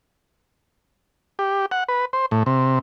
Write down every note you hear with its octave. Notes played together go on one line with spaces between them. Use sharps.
G4
F#5
B4
C5
A2
C3